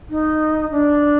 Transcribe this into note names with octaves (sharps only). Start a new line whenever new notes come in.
D#4
D4